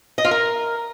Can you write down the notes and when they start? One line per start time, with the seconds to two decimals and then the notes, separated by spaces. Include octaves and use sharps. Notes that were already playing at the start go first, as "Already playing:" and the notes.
0.18 D#5
0.25 F4
0.31 A#4